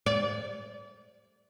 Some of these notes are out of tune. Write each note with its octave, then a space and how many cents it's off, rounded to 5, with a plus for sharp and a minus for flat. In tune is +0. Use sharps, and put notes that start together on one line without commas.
D5 -35